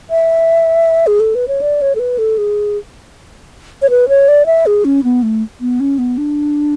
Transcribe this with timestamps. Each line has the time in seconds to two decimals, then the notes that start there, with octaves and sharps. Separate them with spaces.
0.10 E5
1.07 G#4
1.20 A4
1.35 B4
1.48 C#5
1.61 D5
1.81 C#5
1.95 A4
1.99 B4
2.18 A4
2.38 G#4
3.82 C#5
3.90 B4
4.08 C#5
4.28 D5
4.46 E5
4.66 G#4
4.85 C#4
5.04 B3
5.22 A3
5.61 B3
5.80 C#4
5.98 B3
6.18 D4